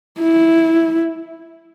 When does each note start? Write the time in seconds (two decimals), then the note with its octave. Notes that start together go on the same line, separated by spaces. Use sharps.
0.19 E4